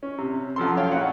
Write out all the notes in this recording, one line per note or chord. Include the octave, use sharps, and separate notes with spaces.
C#4
C3
F#2 F3 A4 C6
C#5 F5 G5
A#1 C#4 F#4 F#5